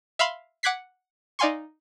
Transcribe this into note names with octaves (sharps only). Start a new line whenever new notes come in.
E5 F5 B5 C6
F#5 D6 F#6 G#6 B6 C7
D#4 D5 F5 G#5 C6 C#6